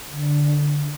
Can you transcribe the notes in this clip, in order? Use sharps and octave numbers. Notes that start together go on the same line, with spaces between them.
D3